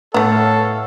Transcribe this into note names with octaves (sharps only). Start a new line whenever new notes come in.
A2 A3 B3 A4 C#5 F5 F#5